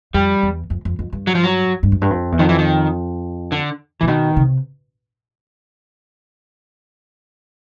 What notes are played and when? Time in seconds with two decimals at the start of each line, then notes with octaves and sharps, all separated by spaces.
0.14 F2 G3
0.43 E2
0.70 F2
0.85 F2
0.99 F2
1.13 G2
1.27 F#3
1.35 F3
1.44 F#3
1.83 G2
1.92 F#2
2.02 G2
2.10 F2
2.32 E2
2.39 F2 D#3
2.49 E3
2.59 D#3
3.52 D3
4.01 A#2 E3
4.08 B2 D#3
4.36 C3